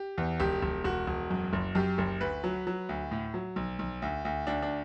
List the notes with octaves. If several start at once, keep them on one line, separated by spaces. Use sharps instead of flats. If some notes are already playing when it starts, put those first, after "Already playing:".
Already playing: G4
E2
E1 G4
E1
E1 F#4
E1
F#2
F#1
F#2 G4
F#1
D2 B4
F#3
F#3
D2
A2
F#3
B1
B1
D2
D2
D2 D4
D4